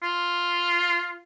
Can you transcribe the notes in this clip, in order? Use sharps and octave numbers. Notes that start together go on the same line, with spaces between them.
F4